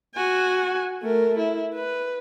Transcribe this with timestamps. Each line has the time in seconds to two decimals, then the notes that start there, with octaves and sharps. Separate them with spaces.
0.15 F#4 G#5
1.03 A3 A#4
1.38 E4
1.74 B4